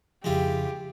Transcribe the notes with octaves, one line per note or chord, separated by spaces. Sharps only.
F2 C#3 F3 G#3 E4 F4 G4